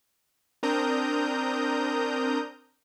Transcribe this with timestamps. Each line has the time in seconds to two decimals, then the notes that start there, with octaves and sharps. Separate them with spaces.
0.63 C4 D4 A#4 A#5 D#6 G6